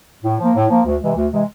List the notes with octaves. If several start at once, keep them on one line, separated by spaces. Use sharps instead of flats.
A2
F3 A#3
A2
F3 A#3
D2
C3 E3 G#3
D2
C3 E3 G#3